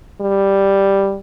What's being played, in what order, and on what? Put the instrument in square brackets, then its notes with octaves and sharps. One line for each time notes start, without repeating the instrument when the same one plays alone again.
[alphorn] G3